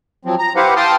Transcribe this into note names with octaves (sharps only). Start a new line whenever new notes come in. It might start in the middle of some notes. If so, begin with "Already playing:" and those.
F3 F#3 C4
A#5
E4 G4 B4 C5 F5 F#5
F5 G5 A5 C6 D#6 F6